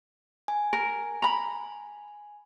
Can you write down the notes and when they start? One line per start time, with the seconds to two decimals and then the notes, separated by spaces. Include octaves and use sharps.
0.48 G#5
0.73 A#4
1.22 A#5 B5